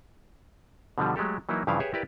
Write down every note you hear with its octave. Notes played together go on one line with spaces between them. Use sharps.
B2 D3 F3 G3
F#3 G#3 A3 G4 A4
E3 F#3 A#3 D#4 E4
G2 C#3 E3 F3 E4 F5
G4 G#4 B4 C#5 E5
E4 G4 A#4 B4 D5